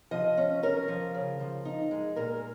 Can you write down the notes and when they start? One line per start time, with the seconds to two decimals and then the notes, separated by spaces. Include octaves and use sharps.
0.11 F3 D#5
0.37 C#4
0.63 C#4 A#4
0.88 F3
1.15 C#3
1.40 F3
1.65 D#4
1.91 G#3
2.16 A#2 A#4